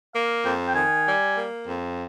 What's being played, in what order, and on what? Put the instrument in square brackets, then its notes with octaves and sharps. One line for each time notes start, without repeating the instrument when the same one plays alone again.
[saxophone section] A#3 [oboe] F5
[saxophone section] F2 [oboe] G5
[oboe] G5
[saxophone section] D#3 [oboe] G#5
[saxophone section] G3
A#3
F2